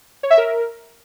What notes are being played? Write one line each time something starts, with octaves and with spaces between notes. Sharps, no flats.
C#5
E5
A#4